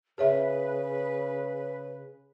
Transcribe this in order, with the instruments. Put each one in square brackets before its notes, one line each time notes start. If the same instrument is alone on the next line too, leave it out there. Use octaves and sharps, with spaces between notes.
[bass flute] C#3 [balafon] G#4 C#5 E5 [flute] B4